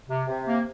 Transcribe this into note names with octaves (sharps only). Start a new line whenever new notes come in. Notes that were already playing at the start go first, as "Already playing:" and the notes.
C3
C3
A#3